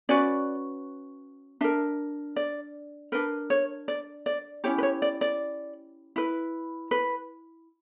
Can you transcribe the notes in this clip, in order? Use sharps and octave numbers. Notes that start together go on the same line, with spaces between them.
C#4 F#4 B4 D5
D4 A#4 E5
D5
D4 A#4 B4
C#5
D5
D5
C#4 E4 G4 C#5
B4
C#5
D5
D5
E4 B4
B4